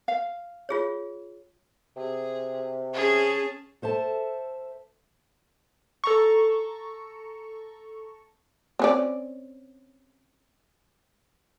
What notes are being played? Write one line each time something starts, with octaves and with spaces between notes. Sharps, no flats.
F5
F4 G#4 C#5
C3 G#4
C#4 G#4 A5
A4 C5 E5 A5
A4 A#5 C#6
C4 C#4 D5